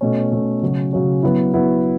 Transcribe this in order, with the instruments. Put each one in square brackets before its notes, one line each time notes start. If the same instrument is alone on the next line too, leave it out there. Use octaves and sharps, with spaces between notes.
[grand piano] B2 A3 C#4
B2 A3 C#4
C#3 F#3 C#4 F#4
C#3 F#3 C#4 F#4
F#3 B3 E4
F#3 B3 E4